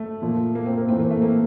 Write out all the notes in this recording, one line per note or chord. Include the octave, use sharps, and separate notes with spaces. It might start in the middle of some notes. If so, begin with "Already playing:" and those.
Already playing: A3
A#2 F3
A#3
C4
A#3
A2 E3 C4
A#3
A3
A#3